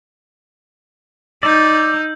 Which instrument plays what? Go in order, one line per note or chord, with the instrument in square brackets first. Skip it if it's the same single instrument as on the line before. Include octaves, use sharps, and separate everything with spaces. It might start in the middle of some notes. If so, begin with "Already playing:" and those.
[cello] D#4 [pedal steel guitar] D5 [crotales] E6 G6